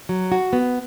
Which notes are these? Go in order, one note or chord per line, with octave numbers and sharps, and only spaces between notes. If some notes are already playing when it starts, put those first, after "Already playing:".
F#3
F#4
B3